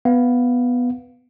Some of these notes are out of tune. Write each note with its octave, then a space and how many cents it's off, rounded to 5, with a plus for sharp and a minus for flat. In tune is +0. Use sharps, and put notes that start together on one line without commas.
B3 +0 F5 +0